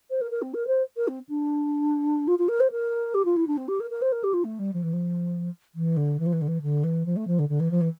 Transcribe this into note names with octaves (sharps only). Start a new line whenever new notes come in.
C5
A#4
A#4
C4
A#4
C5
A#4
C4
D4
F4
F4
A#4
C5
A#4
G4
F4
E4
D4
C4
G4
A#4
A#4
C5
A#4
G4
F4
A3
G3
F3
E3
F3
E3
D3
E3
F3
E3
D3
E3
D3
E3
F3
A3
F3
D3
D3
E3
F3
E3